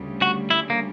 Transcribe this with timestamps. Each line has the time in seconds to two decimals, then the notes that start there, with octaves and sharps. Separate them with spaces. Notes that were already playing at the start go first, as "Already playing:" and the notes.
Already playing: D2 C#3 G3
0.22 F#4
0.50 E4
0.70 A#3